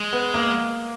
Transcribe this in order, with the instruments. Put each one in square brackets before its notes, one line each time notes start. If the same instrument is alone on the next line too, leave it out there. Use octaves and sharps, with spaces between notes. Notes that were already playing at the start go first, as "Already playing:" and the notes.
Already playing: [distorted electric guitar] G#3
[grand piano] B3
A#3